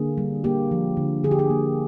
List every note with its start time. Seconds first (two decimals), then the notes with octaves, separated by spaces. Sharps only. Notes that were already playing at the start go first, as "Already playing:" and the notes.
Already playing: D3 A#3 G#4
0.18 G3
0.44 A#3 G4
0.71 F3
0.97 D3
1.24 D3 G#4
1.31 G4
1.39 G#4
1.50 A#3